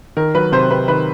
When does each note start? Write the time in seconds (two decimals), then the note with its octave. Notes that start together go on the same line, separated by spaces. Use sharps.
0.17 D#3 A#4
0.35 F#3 B4
0.52 C3 C5
0.71 C3 B4
0.88 D#3 B4